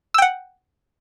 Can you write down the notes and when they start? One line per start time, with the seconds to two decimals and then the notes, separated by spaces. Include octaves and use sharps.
0.14 E6
0.18 G5
0.22 F#5